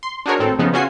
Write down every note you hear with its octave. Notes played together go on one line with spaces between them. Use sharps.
C6
D4 D#4 F#4 G#4 A#4 C#5
G#1 A2 C4 A4
C#3 F3 B3 D#4
C#3 C#4 F4 F#4 G#5 C7